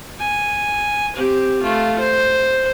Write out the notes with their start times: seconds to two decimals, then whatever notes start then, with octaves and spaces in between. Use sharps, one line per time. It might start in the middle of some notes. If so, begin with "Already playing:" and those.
0.19 G#5
1.16 C4 G4
1.62 A3 F4
1.99 C5